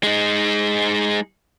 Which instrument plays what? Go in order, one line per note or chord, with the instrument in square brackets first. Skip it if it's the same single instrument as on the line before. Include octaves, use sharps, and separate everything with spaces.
[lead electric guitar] G#3 D#4